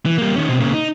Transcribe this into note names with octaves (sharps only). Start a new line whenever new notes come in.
E3
G3 A#3
D#3 C#4
B2 C4
A#2 C#3
D#4